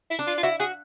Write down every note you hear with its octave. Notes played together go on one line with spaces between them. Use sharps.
E4
D4
F4
F4
E4 F#4
F#4 G#4